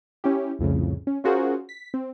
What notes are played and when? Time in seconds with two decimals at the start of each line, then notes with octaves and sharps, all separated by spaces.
0.24 C#4 E4 G4
0.59 C2 F2 A2 C#3
1.07 C#4
1.24 C#4 F4 F#4 G#4 A#4 C5
1.69 B6
1.94 C4